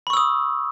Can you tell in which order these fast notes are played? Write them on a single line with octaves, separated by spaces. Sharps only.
B5 C#6 E6 D#6